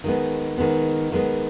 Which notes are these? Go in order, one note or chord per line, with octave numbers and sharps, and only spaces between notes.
D#3 G#3 B3
D#3 G#3 B3
D#3 G#3 B3